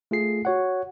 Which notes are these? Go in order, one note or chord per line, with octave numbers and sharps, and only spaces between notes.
A3 F4 G#4 C7
F#4 C#5 F#5